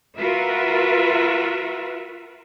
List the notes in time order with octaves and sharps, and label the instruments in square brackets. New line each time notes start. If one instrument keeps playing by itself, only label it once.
[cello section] F4 F#4 A#4 B4 E5